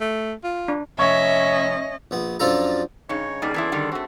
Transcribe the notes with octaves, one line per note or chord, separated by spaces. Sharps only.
A3
F4
D4
F1 C#4 C#5 D#5 E5
A#1 B3
F#2 F3 D4 F4 A4 A#5
G2 C#3 D#4 C#5 C#6
B2 G3 A#3 D#4 G#4 D5
E3 B3 E4 A4 E5 C6
D3 D#3 G3
A3 C4 F#4